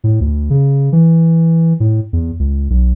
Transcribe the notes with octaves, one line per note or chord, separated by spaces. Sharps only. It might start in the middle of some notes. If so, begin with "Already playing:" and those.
A2
D2
C#3
E3
A2
E2
C#2
B1